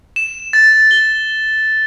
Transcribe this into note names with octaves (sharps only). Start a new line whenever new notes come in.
E7
A6
G7